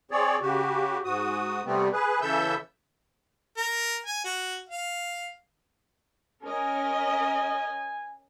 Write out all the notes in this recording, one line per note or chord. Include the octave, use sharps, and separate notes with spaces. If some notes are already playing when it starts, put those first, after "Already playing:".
C4 G#4 C#5 D5
C#3 F#4 G4
G#2 F#4 D#6
C3 G3 A3 B3 C4
G#4 B4
C#3 E3 A4 E5 E6 G6
A#4
G#5
F#4
F5
C#4 A#4 D#5 G#5